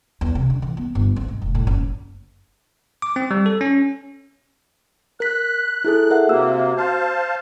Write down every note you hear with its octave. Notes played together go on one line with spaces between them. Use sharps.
E2
C3
D3
E3
B3
G1
C4
G#2
F1
A2
F#1
D6
C4
G3
A4
C#4
A#4 F#6 B6
E4 G#4 A4
A#4 E5 F#5
C3 A#3 F#4 E6
C5 F5 A5